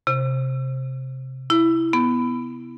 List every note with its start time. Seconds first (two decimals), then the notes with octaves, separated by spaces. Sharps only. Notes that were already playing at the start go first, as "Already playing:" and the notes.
0.07 C3
1.50 E4
1.93 B3